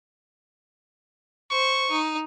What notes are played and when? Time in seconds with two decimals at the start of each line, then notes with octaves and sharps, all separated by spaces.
1.51 C5 C#6
1.90 D#4